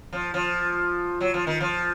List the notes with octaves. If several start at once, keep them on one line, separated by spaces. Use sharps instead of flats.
F3
F3
F#3
F3
D#3
F3